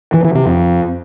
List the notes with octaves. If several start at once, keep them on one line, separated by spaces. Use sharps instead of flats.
E3
E3
C3
F2